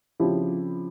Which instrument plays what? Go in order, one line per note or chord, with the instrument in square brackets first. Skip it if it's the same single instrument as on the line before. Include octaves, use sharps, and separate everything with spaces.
[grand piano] C#3 F3 C4 E4 G4